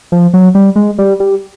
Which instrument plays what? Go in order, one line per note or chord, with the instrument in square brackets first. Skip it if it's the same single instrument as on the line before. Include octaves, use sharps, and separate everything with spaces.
[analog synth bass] F3
F#3
G3
G#3
G3
G3